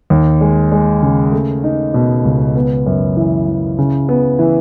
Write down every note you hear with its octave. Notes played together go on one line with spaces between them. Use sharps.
D#2
G#3
G#3
C#3
A3
D#4
B2
C#2
B3
F#2
E3
E3
C#3
B3
E3